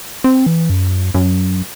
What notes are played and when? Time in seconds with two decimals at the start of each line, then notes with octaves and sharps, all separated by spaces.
0.24 C4
0.46 E3
0.70 F#2
1.14 F#2